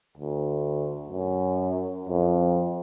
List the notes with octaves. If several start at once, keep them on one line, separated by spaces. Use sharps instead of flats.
D2
F#2
F2